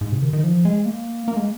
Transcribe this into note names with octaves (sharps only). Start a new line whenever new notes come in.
G#2
C3
D#3
D#3
F3
G#3
A#3
A#3
G#3